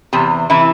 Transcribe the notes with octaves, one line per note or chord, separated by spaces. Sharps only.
E2 C3 G4
C3 E3 E4